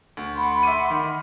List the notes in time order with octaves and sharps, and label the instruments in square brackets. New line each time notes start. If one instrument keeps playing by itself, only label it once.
[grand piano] D2
[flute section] F#5 B5 C6
[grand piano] E5 D6 D#7
D#3